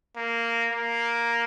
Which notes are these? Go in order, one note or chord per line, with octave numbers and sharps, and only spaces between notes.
A#3
A#3